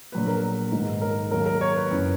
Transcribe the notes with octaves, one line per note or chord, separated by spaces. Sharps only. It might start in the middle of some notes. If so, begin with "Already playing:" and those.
A#1 A#2 F#3 B3 B4
A#4
G#2 D#3 G#3 B3
A#4
D#2 D#3 F#3 A#4
A#4
C#5
B4
F#1 F#2 E3 B3